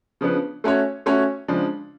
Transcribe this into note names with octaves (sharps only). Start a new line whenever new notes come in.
C#3 F3 B3 D4
A3 C#4 F#4 C#5
A3 C#4 F#4 C#5
C#3 F3 G#3 D4